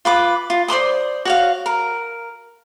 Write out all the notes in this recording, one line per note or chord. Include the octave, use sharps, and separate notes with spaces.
F4 B4 D6
F4
C5 D5 C6 D#6
F#4 C#5 F5
A#4